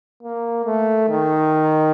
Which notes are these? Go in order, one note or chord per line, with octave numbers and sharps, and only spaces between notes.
A#3
A3
D#3